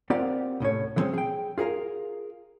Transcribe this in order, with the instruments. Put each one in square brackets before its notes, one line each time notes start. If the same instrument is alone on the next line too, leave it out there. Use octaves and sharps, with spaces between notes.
[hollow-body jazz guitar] C4 F4 G4 A#4 D5 F#5
C2 A2 C#4 C#5
D3 F3 G#3 A#3 C4 C#4
G#4 G5
F4 G#4 A#4 F5